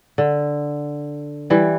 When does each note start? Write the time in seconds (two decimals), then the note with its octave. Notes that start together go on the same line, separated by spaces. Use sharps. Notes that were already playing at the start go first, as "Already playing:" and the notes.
0.18 D3
1.50 E3 G3